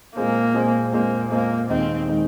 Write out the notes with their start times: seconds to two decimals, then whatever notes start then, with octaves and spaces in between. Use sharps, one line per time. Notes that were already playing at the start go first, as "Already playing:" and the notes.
0.16 A#2 G#3 A#3 C4 G#4 C5
0.54 A#2 G#3 C4 G#4 C5
0.93 A#2 G#3 A#3 C4 G#4 C5
1.31 A#2 G#3 A#3 C4 G#4 C5
1.70 D#2 D#3 G#3 C4 D#4
2.09 D#3 G#3 D#4